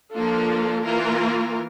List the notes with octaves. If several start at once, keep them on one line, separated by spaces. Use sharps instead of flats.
F3 A#3 D4 F4 A4
E3 A#3 F4 A#4